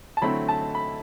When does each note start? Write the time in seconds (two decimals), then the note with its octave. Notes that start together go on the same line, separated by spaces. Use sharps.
0.17 A5
0.22 D3 F#3 A3 C4 E4 B5
0.48 A5
0.75 B5